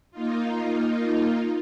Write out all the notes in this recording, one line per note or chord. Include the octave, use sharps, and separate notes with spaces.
A#3 D#4 F4